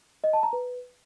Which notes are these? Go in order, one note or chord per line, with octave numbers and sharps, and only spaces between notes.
D#5
A5
A#5
B4